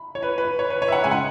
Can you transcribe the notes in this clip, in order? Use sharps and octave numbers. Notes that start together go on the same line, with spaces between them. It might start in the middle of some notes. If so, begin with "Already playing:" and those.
Already playing: B5
C#5
B4
B4
C#5
B4
C#5
E5
F#5
C#3 G#3 G#5
F#5